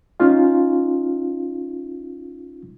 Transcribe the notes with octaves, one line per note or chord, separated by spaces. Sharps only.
C#4 D#4 F4 F5